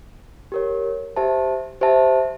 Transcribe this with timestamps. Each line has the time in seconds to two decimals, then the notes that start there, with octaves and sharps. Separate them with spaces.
0.52 G4 A#4 C#5
1.16 G4 C5 E5 A5
1.81 G4 C5 E5 A5